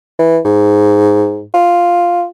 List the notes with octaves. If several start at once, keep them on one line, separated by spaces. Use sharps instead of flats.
E3
G#2
F4